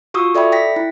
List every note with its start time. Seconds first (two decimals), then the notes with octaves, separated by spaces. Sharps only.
0.14 F4 F#4 C#6 D#6 E6
0.35 A4 D5 E5 G5 B5
0.52 G5 A#6 B6
0.76 E4